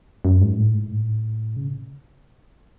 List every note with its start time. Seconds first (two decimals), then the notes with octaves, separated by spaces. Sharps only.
0.25 F#2
0.41 G#2
0.57 A2
0.74 G#2
0.91 A2
1.56 C#3